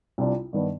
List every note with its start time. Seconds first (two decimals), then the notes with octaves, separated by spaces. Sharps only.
0.18 C2 C3 G3 D4 F4
0.53 G2 D#3 B3 D4